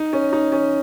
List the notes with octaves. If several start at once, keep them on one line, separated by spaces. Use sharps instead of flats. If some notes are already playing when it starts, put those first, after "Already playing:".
Already playing: D#4
C#4
D#4
C#4